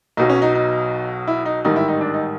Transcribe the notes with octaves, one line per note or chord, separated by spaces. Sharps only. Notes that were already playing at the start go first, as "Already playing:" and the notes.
B1 B2 F#3 D#4
C#4
D#4
D#4
E4
D#4
A1 G#2 D#3 G3 D#4
E4
D#4
D4
D#4